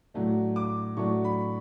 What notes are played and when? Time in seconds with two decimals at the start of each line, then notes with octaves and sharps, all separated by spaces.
0.14 A2 F#3 A3 D4
0.56 D6
0.97 A2 F#3 A3 D4 C#6
1.24 B5